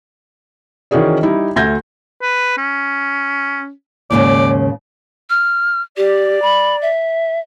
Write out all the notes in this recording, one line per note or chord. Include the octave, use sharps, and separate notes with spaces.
D#3 E3 C#4 F#4 G#4 D5
G3 D#4 E4
D2 A3 G6 G#6 A#6
B4
C#4
D#2 G#2 C#3 D5
F6
G4 D5
B5
E5